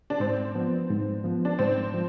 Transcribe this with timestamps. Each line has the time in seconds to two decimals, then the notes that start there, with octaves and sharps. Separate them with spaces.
0.10 D4
0.20 G#2 C4
0.55 F3 B3
0.90 G#2
1.24 F3 B3
1.45 D4
1.59 G#2 C4
1.94 F3